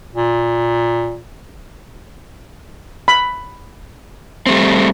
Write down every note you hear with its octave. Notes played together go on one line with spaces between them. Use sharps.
A#2
B5
G3 A3 C4